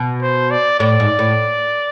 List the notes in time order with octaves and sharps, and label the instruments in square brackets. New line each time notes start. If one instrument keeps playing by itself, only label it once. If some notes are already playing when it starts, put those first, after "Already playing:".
Already playing: [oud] B2
[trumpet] C5
D5
[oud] A2 [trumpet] D5
[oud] G#2
A2